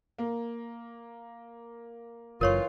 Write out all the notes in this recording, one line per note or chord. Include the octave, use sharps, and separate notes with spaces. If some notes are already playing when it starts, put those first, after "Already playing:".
A#3
F#1 F#2 E3 F4 A#4 C#5 C#6